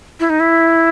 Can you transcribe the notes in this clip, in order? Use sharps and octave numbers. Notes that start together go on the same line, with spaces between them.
E4
D#4
E4